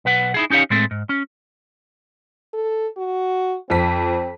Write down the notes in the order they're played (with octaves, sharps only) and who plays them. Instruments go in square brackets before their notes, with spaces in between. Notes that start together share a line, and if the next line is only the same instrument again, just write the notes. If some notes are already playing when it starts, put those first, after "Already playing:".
[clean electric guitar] B1 B4 F#5
D#4 E4 G#4
C#4 D#4 G4 C#5 F5
A2 G#3 A3 C4
G#2
C#4
[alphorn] A4
F#4
[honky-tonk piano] F2 B6 [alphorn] C4